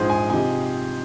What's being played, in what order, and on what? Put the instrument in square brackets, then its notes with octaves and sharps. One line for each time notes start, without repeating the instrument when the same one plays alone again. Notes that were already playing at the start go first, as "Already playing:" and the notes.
Already playing: [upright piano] A#1 G#2 F3 [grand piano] G#4 C5
[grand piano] G#5
[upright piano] C3 F3 C4 D#4 G4 [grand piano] G#5